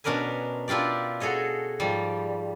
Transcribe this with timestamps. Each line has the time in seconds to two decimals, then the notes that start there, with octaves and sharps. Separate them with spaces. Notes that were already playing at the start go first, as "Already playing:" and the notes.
0.04 B2 C#4 D4 A#4 B4 G#5
0.68 D4 E4 F4 G4 D5
1.20 F#4 G#4 A4 C#5 D#5
1.80 G#2 F3 G3